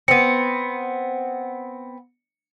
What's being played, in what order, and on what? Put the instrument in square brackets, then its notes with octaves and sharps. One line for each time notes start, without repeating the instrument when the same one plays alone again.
[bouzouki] B3 C4 [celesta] C#7